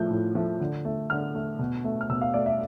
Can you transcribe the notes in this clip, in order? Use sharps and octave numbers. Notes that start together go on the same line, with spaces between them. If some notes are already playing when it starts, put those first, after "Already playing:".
Already playing: A2 F3 A3 G6
A2
F3 A3
D3
A3
D3 F6
A3
B2
A3
F6
B2 E6
F5
A3 D5
E5